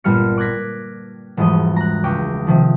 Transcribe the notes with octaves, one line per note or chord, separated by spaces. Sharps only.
G1 A#2 G3 F6 C#7
D6 F#6 G#6 A#6 B6
E1 G#2 F3 G3 D#5
A#5 F#6
C#2 C#4 G5 D6
C3 D#3 F3